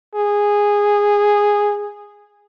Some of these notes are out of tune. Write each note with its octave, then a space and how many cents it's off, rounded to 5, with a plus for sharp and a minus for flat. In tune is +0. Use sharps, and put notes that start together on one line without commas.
G#4 -10